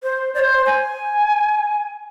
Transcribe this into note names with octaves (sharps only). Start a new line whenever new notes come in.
C5
D5
C5
G#5